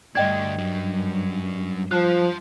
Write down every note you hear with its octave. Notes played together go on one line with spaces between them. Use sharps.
D2 G2 D4 D#5 G5 G#6
F#2 F#3
F3 F4 A5 F#6